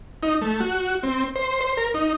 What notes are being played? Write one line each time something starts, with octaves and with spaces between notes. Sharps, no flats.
D#4
A3
F#4
C4
C5
C5
A#4
D#4